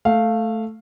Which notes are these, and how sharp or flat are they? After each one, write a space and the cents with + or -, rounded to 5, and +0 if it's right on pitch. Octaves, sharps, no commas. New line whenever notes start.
A3 +0 F5 -5